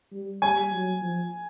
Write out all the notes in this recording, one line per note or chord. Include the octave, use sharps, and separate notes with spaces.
G3
G3 G#5
F#3
F3